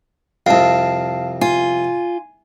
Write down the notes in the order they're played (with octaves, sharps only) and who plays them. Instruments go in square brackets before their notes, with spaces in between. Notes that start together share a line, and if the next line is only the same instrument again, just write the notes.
[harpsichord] C2 F2 [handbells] F5 A5
[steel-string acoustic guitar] F4 [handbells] G#5